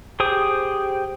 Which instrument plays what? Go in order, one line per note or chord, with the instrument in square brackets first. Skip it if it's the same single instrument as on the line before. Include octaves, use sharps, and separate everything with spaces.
[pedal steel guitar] G4 G#4 C5 D#6